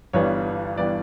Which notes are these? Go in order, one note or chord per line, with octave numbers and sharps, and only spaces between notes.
G1 G2 E3 G3 B3 C#5
E3 G3 B3 D5